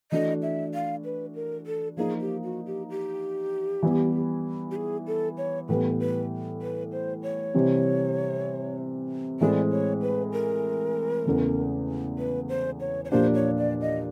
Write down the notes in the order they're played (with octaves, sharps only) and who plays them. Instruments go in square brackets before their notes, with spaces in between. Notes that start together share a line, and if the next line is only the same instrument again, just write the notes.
[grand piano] E3 A3 D4 F#4 [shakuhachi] D#5
[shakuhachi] E5
F5
B4
A#4
A4
[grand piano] F3 A#3 D#4 [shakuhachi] G#4
[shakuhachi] G4
F#4
G4
G4
[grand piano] E3 G3 B3 E4
[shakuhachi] G4
G#4
A4
C#5
[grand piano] A2 E3 G3 B3 [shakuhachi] B4
[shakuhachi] B4
B4
C5
C#5
[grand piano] C3 E3 G3 C4
[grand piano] A2 E3 G#3 C4 [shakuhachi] D5
[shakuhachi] C#5
B4
A#4
[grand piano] E2 C#3 E3 A3
[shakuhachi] B4
C5
C#5
C#5
[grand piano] A#2 F3 A#3 D4 G4 [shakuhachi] C5
[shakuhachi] C#5
D5
D#5